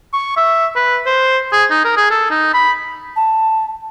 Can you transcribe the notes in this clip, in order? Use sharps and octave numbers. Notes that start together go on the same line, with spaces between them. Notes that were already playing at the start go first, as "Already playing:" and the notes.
C#6
E5
B4
C5
G#4
D#4
A#4
G#4
A4
D#4
B5
A5